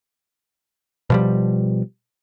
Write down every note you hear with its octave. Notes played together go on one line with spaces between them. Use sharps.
B2 F3 G3